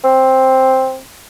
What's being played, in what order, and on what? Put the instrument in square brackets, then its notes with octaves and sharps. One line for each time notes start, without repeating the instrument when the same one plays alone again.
[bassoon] C4